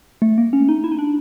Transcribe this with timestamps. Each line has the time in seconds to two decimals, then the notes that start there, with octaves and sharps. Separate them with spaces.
0.22 A3
0.38 A#3
0.53 C#4
0.69 D#4
0.84 E4
0.92 D#4
0.99 D4